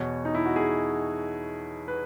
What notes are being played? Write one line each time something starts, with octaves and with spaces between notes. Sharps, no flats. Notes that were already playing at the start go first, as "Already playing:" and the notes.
Already playing: E2 B2 C#5
D#4
E4
F#4
G#4
B4